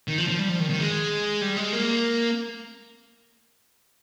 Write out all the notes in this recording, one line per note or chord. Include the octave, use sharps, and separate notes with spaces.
D#3
F3
F3
G3
F3
D#3
D#3
G#3
G3
G#3
A#3